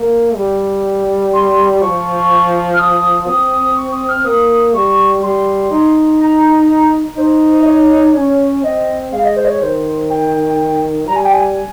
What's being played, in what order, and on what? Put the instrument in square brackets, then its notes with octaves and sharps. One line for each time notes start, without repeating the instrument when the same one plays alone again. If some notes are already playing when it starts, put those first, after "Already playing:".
Already playing: [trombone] A#3
G3
[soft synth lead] C6
[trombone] F3 [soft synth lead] C#6
[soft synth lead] F6
D#6
[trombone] C4 [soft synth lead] D#6
[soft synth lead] D#6
D#6
C#6
D#6
F6
[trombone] A#3 [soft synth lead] D#6
[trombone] G3 [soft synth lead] C#6
[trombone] G3 [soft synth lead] C6
[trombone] D#4
[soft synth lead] A#5
[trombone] D#4 [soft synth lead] C5
[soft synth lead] D#5
C#5
[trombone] C#4
[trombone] C4 [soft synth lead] D#5
[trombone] G#3 [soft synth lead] F5
[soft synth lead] D#5
C5
D#5
C#5
[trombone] D#3 [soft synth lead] C5
[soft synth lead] G5
[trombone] G3 [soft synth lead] A#5
[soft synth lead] G#5
G5
G#5